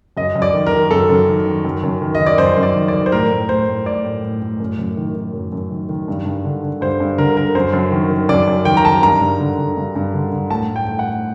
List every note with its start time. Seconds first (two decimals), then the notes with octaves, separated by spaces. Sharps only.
0.17 F#2 D#5
0.35 F#2
0.42 D5
0.54 D#3
0.66 A#4
0.72 D#3
0.91 F#2 A4
1.09 F#2
1.28 D#3
1.46 D#3
1.65 F#2
1.83 F#2
2.02 D#3
2.15 D#3 D#5
2.26 D5
2.38 F#2 C5
2.57 F#2
2.63 D5
2.75 D#3
2.88 D5
2.94 D#3
3.06 C5
3.12 A2 A#4
3.31 A2
3.49 A2 C5
3.68 A2
3.86 A2 D5
4.05 A2
4.24 A2
4.42 A2
4.60 F#2
4.79 F#2
4.97 D#3
5.15 D#3
5.33 F#2
5.52 F#2
5.71 D#3
5.89 D#3
6.08 G2
6.26 G2
6.45 D3
6.63 D3
6.81 G2 C5
7.00 G2
7.18 D3 A#4
7.37 D3 A#4
7.55 F#2 C5
7.73 F#2
7.92 D#3
8.10 D#3
8.29 F#2 D5
8.47 F#2
8.65 D#3 G5
8.77 A#5
8.84 D#3 A5
9.02 G2 A#5
9.21 G2
9.40 D3
9.58 D3
9.77 G2
9.96 G2
10.14 D3
10.32 D3
10.50 A2 A5
10.69 A2
10.76 G5
10.87 A2
10.99 F#5
11.06 A2